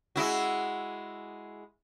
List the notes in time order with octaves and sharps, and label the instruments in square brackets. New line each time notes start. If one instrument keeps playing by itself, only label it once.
[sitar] G#3 E4 F#4